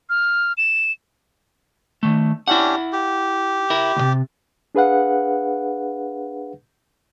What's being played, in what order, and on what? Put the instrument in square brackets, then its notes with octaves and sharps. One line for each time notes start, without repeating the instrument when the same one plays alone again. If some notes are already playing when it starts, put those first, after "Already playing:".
[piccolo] F6
E7
[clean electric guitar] D#3 A3
[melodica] C#4 D4 G4 [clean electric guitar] E4 F#5
[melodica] G4
[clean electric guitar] E4 A#4
D2 C3
[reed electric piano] D4 G#4 B4 F5 F#5